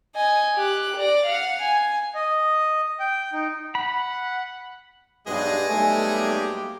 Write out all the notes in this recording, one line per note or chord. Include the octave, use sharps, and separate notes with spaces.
D#5 G#5
G4 F#6
D5 A#6
F5 F#5
G#5
D#5
G5
D#4
F#5 B5
B1 G2 G#3 F#4 G#4 D#5
B1 G3 A3 G#5
A#3 G4